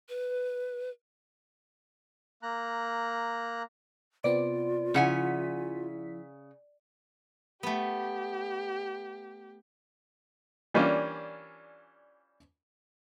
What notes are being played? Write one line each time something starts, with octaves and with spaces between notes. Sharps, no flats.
B4
A#3 A#5 F#6
C3 B3 C4 F4 D5
C#3 F3 E4 F#5 G#5 B6
A3 B3 G4
E3 G3 A#3 C#4 D4 F4